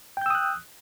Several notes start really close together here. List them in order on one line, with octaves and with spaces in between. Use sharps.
G5 G6 E6 D#6 F#6